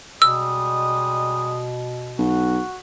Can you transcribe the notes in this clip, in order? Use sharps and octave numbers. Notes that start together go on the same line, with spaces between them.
B2 G3 G#3 D#6 E6
B1 F#4